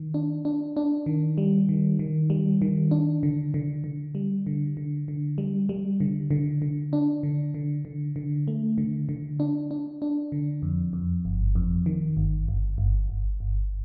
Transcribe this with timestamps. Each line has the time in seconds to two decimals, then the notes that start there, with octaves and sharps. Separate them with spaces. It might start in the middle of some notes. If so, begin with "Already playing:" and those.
Already playing: D#3
0.14 D4
0.45 D4
0.77 D4
1.06 D#3
1.38 G3
1.69 D#3
1.99 D#3
2.30 G3
2.62 D#3
2.91 D4
3.23 D3
3.54 D3
3.84 D3
4.15 G3
4.47 D3
4.77 D3
5.08 D3
5.38 G3
5.69 G3
6.00 D3
6.31 D3
6.62 D3
6.93 D4
7.23 D3
7.54 D3
7.85 D3
8.16 D3
8.48 A3
8.78 D3
9.09 D3
9.40 D4
9.71 D4
10.02 D4
10.32 D3
10.62 F2
10.93 F2
11.25 G1
11.55 F2
11.86 D#3
12.17 G1
12.48 G1
12.78 G1
13.09 G1
13.40 G1